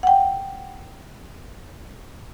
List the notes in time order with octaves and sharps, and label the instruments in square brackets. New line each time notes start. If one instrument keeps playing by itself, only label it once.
[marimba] F#5 G5